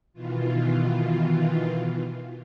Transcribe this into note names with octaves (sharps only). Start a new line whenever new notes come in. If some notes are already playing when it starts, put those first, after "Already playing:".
B2 D#3 E3 F4